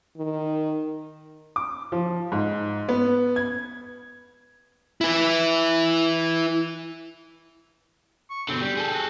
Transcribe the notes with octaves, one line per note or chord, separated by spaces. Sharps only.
D#3
D6
F3
G#2
B3
G#6
E4 B4
C#6
B2 D3 C4
G3 G5
G#4 A4
F#4